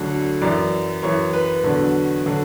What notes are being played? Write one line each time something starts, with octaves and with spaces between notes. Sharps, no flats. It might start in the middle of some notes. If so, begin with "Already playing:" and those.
Already playing: D2 D3 F#3
F#2 E3 D5
F#2 E3 C#5
B4
E2 D3 F#3
D3 F#3